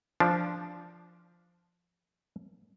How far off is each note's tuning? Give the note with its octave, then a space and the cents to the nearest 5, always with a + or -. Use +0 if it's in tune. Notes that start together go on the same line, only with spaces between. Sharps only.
F3 -5 D4 +0